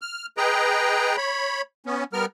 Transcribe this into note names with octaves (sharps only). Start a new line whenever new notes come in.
F6
G#4 B4 D#5 G5 A#5
C#5 B5
B3 C#4
G3 B3 A#4 F6